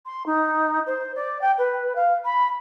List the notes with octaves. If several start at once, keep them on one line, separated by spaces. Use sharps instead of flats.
C6
D#4
C5
D5
G5
B4
F5
B5